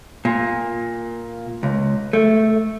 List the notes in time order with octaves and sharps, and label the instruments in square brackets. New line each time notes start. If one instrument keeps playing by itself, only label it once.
[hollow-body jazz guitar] A#2
C#2
A3